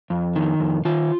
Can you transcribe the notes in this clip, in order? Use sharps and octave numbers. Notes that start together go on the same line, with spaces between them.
F2
D#3
F2
D#3 F4